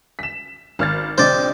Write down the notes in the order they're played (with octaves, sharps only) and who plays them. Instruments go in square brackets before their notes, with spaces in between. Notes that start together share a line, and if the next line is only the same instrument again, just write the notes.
[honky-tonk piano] B6 E7
G#1 F6 A6
[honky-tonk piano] A#1 C3 D#5 [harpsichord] C5 D5